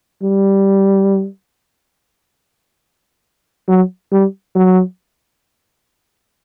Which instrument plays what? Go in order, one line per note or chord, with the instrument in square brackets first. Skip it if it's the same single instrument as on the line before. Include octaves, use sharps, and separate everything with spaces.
[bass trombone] G3
F#3
G3
F#3